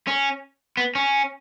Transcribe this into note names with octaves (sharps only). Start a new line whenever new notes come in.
C#4
B3
C#4